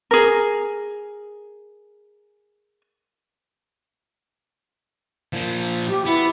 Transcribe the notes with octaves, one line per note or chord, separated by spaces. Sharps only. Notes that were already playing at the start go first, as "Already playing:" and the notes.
G#4 A#4
A#2 F3
G4
B3 E4